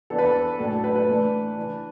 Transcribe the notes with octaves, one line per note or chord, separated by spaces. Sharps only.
E3 B3 D4 A4
B4
A4
A2 F#3 D4 A4
A4
B4
B4
E3 A3 D4
E3 D4